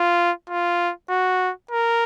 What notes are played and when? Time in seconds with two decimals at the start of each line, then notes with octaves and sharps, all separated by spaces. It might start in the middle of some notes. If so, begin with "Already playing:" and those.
Already playing: F4
0.49 F4
1.09 F#4
1.71 A#4